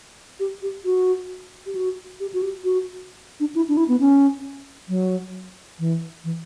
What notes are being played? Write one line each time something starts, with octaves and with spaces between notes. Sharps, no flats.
G4
G4
F#4
G4
F#4
G4
F#4
G4
F#4
D4
E4
D4
E4
B3
C#4
F#3
E3
E3